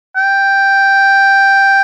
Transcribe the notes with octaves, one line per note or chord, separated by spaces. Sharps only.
G5